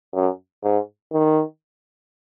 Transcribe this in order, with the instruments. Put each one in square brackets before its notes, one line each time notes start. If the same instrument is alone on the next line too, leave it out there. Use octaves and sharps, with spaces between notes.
[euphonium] F#2
G#2
D#3